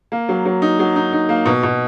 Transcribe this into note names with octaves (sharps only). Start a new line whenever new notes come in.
A#3
F#3
F#3
D#4
F#3
D#4
D#4
A#3
B2
B2